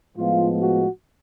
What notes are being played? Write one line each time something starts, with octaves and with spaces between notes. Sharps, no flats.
A2 F3 G#3 B3 F4
F#4